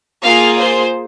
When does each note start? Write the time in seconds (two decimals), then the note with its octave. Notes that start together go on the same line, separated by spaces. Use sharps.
0.23 A#3 F4 G#4 F5
0.59 C5